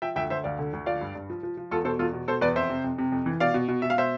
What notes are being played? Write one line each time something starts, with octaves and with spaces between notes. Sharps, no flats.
F3 E5 G5
D2 E5 G5
D2 C5 E5
D2 D5 F5
D3
D2
F3 D5 F5
G2
G2
F3
F3
F3
E2 F4 A4
B2 A4 C5
E2 F4 A4
B2
B2 A4 C5
E2 B4 D5
F2 C5 E5
C3
F2
C3
F2
E3
B2 D5 F5
B2
B2
B2 E5
F5
B2 C5 E5